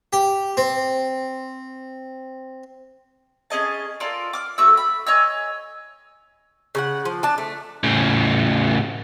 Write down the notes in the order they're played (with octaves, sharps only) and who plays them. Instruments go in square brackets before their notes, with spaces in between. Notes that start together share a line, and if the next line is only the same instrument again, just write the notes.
[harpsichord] G4
C4
[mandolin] C#4 G#4 D#5 A5
F4 A4 A#4 D5
D6 F6
A3 F#4 E6
B5
C#5 D#5 G#5 E6
[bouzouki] C#3 A4 F#5
F3
D4 A5
A3
[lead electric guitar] A2 C#3